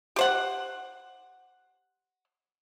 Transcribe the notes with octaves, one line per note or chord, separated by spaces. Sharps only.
G4 C5 F#5